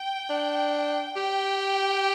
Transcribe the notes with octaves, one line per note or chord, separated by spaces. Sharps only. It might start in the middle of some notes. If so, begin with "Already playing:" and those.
Already playing: G5
D4
G4 G5